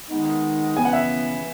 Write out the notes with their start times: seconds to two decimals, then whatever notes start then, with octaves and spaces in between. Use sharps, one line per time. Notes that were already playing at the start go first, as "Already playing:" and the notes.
0.09 D#3 G#3 B3 D#4
0.77 C#3 E3 B3 G#5
0.85 F#5
0.93 E5